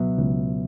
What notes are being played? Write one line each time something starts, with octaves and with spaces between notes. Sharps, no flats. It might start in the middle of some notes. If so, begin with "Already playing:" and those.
Already playing: C#2 B2 F#3 B3 E5
C#2